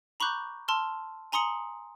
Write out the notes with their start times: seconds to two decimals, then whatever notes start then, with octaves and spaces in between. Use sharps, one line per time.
0.20 A#5 B5 C#6 D6 F#6 G6
0.68 A5 C6 E6 F6
1.32 G#5 A#5 C6 D#6 C#7 F#7